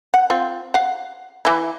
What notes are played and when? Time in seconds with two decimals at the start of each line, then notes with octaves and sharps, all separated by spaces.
0.14 F#5
0.30 C4 F4
0.74 F5 F#5
1.45 E3 E4